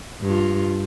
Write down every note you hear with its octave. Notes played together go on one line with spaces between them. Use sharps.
G2 F4